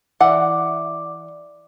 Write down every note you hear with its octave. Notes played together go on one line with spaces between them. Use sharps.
E3 D5 E5 F#5 D6